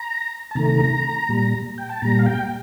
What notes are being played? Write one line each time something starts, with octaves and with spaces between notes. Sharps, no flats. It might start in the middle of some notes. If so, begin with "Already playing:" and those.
Already playing: A#5
A5
C3 D#3 A3 A#5
A#2 G3
G5
A5
A#2 G3 A#5
F5
G5